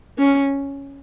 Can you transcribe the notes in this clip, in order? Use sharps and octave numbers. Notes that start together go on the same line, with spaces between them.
C#4